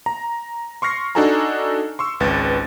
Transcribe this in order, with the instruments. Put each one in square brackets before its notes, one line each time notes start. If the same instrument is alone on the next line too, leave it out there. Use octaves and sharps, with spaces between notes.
[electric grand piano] A#5
C6 C#6 F6 A#6 C7
D4 D#4 F#4 A4 G#5 A#5
C6 C#6 E6
G#1 C#2 B4 A6